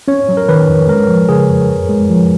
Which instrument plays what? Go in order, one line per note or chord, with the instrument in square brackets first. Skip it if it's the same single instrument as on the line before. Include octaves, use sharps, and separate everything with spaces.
[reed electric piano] C#4 [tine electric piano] C#5
[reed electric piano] F#3
[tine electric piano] A#4
[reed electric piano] D#3 [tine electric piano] B4
[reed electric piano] F2
[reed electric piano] G#3 [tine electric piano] A#4
[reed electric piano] F3
[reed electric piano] C#3 [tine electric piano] G#4
[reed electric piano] F2
F#2
G#3
F3